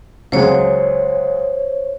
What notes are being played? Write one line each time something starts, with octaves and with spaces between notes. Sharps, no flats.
C#2 F#3 G#3 C5 C#5